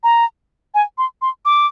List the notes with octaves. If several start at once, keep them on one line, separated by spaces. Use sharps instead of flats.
A#5
G#5
C6
C6
D6